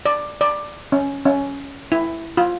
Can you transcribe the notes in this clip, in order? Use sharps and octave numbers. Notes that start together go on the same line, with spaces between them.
D5
D5
C#4
C#4
E4
F4